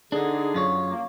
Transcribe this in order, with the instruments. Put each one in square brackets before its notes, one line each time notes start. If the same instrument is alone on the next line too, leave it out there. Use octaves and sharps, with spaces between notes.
[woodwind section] D3 G#4 [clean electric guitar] D4 D#4
[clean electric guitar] F#2 F4 C#5
[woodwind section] A#3